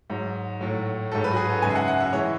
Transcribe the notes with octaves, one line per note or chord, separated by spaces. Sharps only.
G#2 F#3
A2 F#3
G#2 F#3 A4
B4
F#4
G#4
A4
F#2 C#3 G#3 G#5
E5
F#5
F#5
E5
E3 G#3 C#5